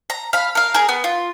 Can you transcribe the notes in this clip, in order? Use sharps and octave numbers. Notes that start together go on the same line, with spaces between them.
A#5
F5 B5
A#4 F5
G#4 A#4
B3
F4